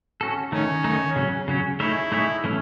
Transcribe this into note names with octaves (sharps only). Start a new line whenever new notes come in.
C#4 F#4 A4
D#3 A3 C#4 D#4
D#3 A3 D#4
C#3 F#3 C#4
C#3 F#3 C#4
A3 D#4 E4 G#4 C#5 E5
A3 D#4 G#4 C#5 E5
E3 A3 C#4